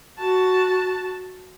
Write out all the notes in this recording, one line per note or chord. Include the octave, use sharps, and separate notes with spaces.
F#4 A5